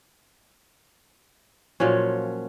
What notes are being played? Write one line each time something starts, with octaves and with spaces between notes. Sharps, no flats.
A#2 F3 F#3 C#4